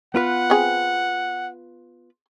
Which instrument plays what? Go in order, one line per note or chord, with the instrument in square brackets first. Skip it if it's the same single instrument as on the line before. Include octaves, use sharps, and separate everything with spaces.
[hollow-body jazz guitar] B3 F4 B4 [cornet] F#5
[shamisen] C4 G#4